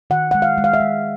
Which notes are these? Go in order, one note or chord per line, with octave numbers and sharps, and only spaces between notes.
D#3 F#5
G#3 F#5
F5
G#3
F5
E5
G#3